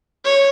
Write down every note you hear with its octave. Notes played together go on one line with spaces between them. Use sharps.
C#5